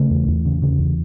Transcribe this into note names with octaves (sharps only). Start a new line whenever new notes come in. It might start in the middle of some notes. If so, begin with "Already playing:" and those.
Already playing: C#3 A3
E2
E2
C#3
C#3
E2